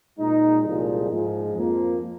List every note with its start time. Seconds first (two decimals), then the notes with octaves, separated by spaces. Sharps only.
0.18 A#2 G#3 D#4
0.64 C2 A#2 F3 G#3
1.09 G#2 F3 G#3
1.54 F2 F3 A#3